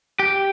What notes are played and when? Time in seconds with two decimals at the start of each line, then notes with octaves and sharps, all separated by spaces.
0.19 G4